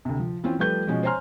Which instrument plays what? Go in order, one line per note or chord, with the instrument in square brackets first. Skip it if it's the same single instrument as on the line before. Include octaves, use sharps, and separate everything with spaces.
[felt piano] D2 C3
F3
E3 C4 C#4 F4
F3 G3 A3 B4 G6
B2 F3 G#3 C#4
C5 C#5 G#5 A#5 C6 F6